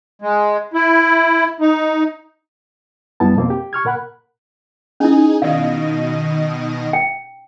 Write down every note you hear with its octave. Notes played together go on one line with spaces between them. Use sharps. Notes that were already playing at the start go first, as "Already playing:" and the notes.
G#3
E4
D#4
F#2 G3 B3 E4 A5
F2 B2 A#3 C4
G4
C#6 F6 G#6
A#2 A#4 F#5 B5 F#6
C#4 D#4 E4 G#4
B2 D#3 D5 D#5 F5
G5